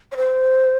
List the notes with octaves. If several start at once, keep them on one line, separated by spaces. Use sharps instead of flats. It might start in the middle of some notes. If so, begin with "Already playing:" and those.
C#5
C5